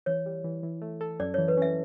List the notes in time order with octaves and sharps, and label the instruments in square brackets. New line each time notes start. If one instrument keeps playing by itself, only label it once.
[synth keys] E3 [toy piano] C#5
[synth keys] G3
E3
E3
A3
A4
[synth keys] F#2 [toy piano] D5
[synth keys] E3 [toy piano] C#5
[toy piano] B4
[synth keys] C#4 [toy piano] E5